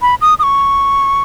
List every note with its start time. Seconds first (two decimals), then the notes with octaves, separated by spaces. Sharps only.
0.02 B5
0.21 D#6
0.39 D#6
0.43 C#6